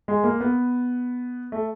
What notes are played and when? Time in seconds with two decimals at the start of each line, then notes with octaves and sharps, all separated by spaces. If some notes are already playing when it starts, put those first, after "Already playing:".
0.08 G#3
0.24 A#3
0.40 B3
1.52 A3